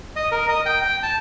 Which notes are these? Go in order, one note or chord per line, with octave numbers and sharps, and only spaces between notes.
D#5
A#4
D#5
G5
G5
A5